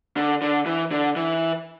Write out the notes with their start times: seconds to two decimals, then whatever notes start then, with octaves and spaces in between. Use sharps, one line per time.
0.17 D3
0.42 D3
0.66 E3
0.91 D3
1.16 E3